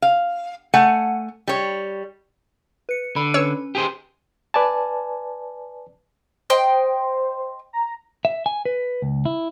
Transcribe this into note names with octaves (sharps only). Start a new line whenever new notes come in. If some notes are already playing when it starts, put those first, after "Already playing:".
F5
A3 F#5 G#5
G3 C#5
B4 C#7
D3 B5
C#4 B4 C#5 E6 C#7
G4 G#4 C5
B4 D5 G#5 A5
C5 D#5 G5 C6
A#5
E5
G#5
B4
C#2
E4